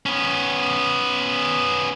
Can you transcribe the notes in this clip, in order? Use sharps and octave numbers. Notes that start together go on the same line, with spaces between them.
B3 C#4